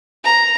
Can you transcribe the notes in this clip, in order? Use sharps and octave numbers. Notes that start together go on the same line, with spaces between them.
A#5